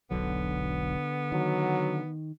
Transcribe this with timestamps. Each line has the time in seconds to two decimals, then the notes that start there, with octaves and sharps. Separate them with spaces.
0.11 E1 B1 D3 F#3 B3
1.32 D#3 F#3